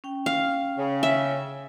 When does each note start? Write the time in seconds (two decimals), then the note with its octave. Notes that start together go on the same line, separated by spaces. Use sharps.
0.04 C#4 G5
0.26 F5
0.77 C#3
1.03 E5